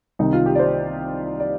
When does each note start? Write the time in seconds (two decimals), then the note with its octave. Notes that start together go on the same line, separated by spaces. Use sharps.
0.19 C2 C3 D#3 D#4
0.33 F4
0.46 G4
0.55 D5
0.59 C5
1.40 D5